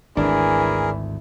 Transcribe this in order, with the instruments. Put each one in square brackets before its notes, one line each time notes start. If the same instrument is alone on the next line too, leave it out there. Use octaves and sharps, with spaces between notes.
[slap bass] G#1 D2 [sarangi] E3 [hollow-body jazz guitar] D4 [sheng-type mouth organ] G#4 A#4